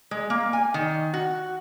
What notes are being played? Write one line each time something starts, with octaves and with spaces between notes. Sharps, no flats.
G#3
A#3
G#5
D#3
F#4